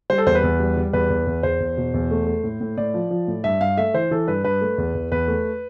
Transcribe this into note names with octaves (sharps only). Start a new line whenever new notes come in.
G3 C5
A4
E2 C5
B4
E2
G3
G3
E2 B4
E2
E2
E2 C5
E2
B2
E2
A3
A3
A2
A2
A2 D5
F3
F3
A2
G2 E5
G2 F5
A3 E5
E3 C5
E3 A4
G2 B4
G2 B4
A3
E2
E2
E2 B4
A3